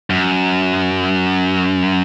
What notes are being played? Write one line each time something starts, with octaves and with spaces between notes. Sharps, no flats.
F#2